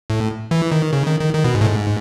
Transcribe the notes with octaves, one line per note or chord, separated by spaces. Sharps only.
A2
E3
D#3
C#3
D#3
D#3
D#3
B2
G#2
A2
G#2